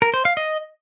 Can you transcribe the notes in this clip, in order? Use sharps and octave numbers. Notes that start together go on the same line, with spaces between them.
A#4
C5
F5
D#5